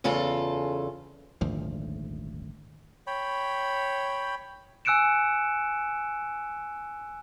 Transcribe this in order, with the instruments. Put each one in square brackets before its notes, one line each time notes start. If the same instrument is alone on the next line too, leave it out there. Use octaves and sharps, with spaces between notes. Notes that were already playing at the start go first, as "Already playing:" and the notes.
[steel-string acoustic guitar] E2 C#3 F4 A4 A5
[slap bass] D#1 G#1 D2 F3
[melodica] C#5 G5 B5
[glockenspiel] G#5 E6 F#6 C#7 D7 E7